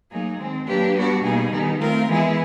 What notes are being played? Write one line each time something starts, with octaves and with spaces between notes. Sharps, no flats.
F#3 A#3 D#4 G#4
D#3 G#3 C4
F#3 A#3 D4 G4 B4
G3 B3 D4 F#4
B2 G3 A#3 D#4 G#4
D#3 G3 B3 D#4
A3 C4 F4 A#4
E3 G#3 B3 E4 G#4